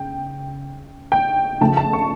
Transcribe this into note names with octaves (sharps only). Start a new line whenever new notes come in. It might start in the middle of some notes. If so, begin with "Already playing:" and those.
Already playing: C#3 G5
G5
C#3 F3 A3 A5
A5
C#6